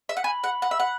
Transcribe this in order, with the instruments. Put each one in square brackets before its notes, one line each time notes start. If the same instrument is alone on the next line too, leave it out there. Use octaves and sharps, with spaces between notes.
[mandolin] E5
F#5
[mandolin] G#5 [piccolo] B5
[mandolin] F#5
F#5
E5
F#5